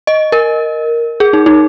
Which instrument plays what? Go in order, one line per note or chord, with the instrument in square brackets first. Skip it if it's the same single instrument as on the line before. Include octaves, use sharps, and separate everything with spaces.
[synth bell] D#5
A#4
G#4
D#4
D#4